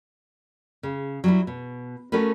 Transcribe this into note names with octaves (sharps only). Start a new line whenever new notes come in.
C#3
F#3 G3 E4
B2
A3 C#4 F#4 A#4 B4